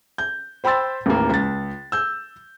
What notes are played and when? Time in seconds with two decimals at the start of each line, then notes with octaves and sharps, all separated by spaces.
0.18 G6
0.64 C5 G5 B5 C6 E6 A6
1.06 A1 D#2 A#3
1.29 C#2 A6
1.92 E6 G6